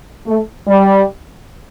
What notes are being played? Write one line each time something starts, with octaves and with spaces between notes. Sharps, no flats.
A3
G3